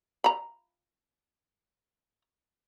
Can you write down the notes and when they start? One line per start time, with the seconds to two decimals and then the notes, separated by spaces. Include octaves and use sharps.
0.24 A#5 B5